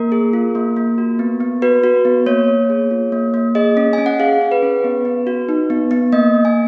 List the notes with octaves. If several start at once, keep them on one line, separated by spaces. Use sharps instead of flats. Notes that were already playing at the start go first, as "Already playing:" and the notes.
Already playing: A#3 A#4
G#4
F4
A#3
A#3
F#4
B3
B3
F#4 B4
F#4
B3
A#3 C#5
A#3
G#4
F4
A#3
A#3
G#4 D#5
C#4
C#4 G#5
F#5
G#4 F5
G#4
B4
C#4
B3
B3
F#4
D#4
B3
B3
A#3 D#5
A#3
G#5